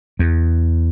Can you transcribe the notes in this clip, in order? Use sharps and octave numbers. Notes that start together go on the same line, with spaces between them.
E2